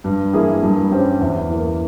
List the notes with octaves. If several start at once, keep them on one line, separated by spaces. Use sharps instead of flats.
G2
E3 A#3 E4 G#4
G2
G3 C#4 G4 C5
E2
E3 A#3